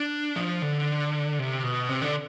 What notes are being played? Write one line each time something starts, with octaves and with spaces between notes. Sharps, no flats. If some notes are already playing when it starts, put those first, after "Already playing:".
Already playing: D4
F3
D3
C3
B2
C3
D3